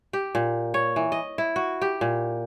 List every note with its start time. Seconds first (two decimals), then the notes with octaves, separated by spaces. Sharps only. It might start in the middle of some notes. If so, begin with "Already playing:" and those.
0.13 G4
0.35 A#2
0.74 C#5
0.96 E3
1.12 D#5
1.38 E4
1.56 F#4
1.82 G4
2.01 A#2